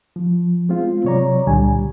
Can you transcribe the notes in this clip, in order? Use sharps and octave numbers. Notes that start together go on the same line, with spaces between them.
F3
G#3 C4 F4
C3 F#3 C#5 D5 A#5
C#2 A#2 D3 G3 G#5